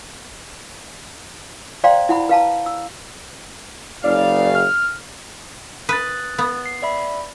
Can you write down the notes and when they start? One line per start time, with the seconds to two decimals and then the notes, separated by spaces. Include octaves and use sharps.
1.84 C5 D5 F5 G5 A#5 C6
2.09 E4 F#5 B5
2.29 B4 F5 A5 A#5
2.66 E6
4.04 F#1 C#3 D5 F5
4.55 F6
5.89 B4 D#6 F#6 A6
6.38 B3
6.66 C7
6.82 D5 E5 B5